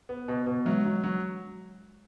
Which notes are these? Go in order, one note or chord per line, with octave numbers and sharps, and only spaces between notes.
B3
B2
B2
F#3 G#3
F#3
F#3